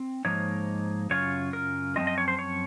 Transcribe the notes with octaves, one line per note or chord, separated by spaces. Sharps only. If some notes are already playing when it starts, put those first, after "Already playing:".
Already playing: C4
G#2 F3 A#3 D#4 C#5
F#2 C#3 F#3 C#4 F4 C#5
A#4
F#2 F3 G#3 C4 F4 D#5
D#5
C#5
C5
C#5